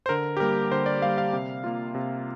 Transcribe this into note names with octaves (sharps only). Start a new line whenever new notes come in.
C5
D3 A#4
G4
G3 A#3 A#4
D3 C5
D5
G3 A#3 F5
F5
C3
A#3 F4
C3